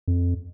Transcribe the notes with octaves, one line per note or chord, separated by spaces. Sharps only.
F2